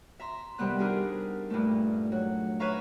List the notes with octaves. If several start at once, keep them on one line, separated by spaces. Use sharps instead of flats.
E5 A#5 C6
C3 D#3 G3 B3 F#6
D4 D#4 G4 G#4 A#4
G2 A#2 A3
F#3
B4 C#5 E5 F5 A#5 C#6